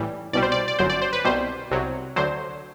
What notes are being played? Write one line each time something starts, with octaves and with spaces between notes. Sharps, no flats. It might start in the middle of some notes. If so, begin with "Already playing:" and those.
Already playing: A1 A2 E3 G3
C2 B2 G3 D5
C5
D5
D5
G1 F#2 F#3 C5
D5
C5
B4
C2 B2 G3 C5
C2 C3 F#3
D2 D3 F#3 C5